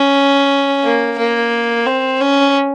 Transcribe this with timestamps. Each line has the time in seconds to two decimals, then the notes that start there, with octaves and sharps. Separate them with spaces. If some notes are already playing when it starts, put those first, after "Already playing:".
Already playing: C#4
0.83 A#3
1.18 A#3
1.86 C4
2.20 C#4